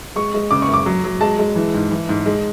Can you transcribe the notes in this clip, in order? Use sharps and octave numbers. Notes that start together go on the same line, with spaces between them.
G#3 C#6
G#3
C#3 D6
C#6
F#2
D6
F#3
F#3
G#3 A5
G#3
E3
G#2
E3
G#2
G#3